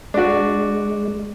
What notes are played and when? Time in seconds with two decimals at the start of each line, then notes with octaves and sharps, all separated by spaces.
0.14 G#3 D4 F#4